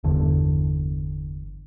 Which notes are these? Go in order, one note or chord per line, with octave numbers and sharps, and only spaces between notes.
G1 E2 D3